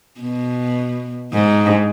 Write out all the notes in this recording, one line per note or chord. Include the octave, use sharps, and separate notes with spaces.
B2
G#2